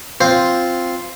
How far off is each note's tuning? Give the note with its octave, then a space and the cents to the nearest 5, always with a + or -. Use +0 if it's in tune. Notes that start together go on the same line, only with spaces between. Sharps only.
C4 +0 F4 +0 C5 +0